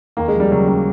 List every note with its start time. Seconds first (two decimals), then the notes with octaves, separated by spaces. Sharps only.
0.17 D#2 A#3
0.28 G#3
0.34 F3
0.40 G3
0.51 C#3 F#3
0.68 G3